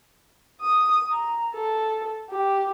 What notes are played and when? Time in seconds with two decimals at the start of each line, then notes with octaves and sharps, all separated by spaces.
0.61 D#6
1.11 A#5
1.54 A4
2.30 G4